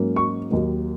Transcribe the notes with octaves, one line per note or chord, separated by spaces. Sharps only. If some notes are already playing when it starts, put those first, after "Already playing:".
Already playing: G#2 F#3 A#3 C#4
C#6
D#2 D#3 F#3 A#3